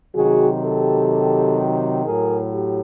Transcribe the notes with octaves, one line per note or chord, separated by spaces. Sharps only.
C3 D#3 F#3 F#4 G#4
G4 A4
A2 F#3 G#4 A#4
G4